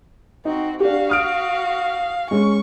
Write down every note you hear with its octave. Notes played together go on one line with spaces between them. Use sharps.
C4 D#4 F#4
D4 F#4 G4 F5
D#6 F6 D7
G#3 C#4 C#6